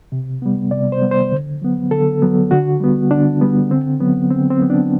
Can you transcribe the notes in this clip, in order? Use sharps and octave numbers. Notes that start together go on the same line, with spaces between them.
C3
G3 B3
C3 D5
C5
G3 B3
C5
D3
F#3 B3
D3 A4
F#3 B3
D3 F#4
G3 B3
D3 D4
G3 B3
D3 C4
F#3 B3
D3 C4
C4
F#3 B3
D4